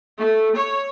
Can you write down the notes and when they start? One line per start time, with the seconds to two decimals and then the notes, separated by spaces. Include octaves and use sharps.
0.19 A3
0.57 C#5